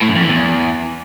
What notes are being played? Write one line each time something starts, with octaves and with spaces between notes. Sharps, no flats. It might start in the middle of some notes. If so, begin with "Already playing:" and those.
A2
F#2
F2
E3
E2